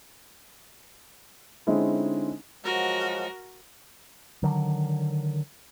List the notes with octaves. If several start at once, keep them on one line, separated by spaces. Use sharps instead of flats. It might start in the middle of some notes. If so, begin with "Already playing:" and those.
D3 G#3 C4 C#4 D#4 E4
F3 F#3 G#3 F#4 A#4
D3 D#3 F#3